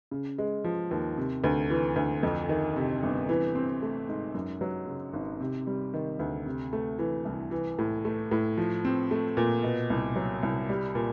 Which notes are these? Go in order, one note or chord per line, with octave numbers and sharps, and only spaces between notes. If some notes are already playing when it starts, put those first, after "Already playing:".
C#3
G#3
F3
D#2
C3
D2
E3
D2
F2
D#3
C3
G1
E3
C4
A3
G#2
F#2
F#3
C#3
G#1
C3
G3
D#3
D2
C3
A3
E3
C2
E3
A2
A3
A2
F3
C4
A3
A#2
B2
C2
F#3
C2
G3
A#2